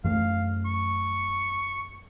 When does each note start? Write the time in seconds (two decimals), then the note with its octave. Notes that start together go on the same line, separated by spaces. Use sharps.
0.04 F#2 E3 A3 F5
0.65 C#6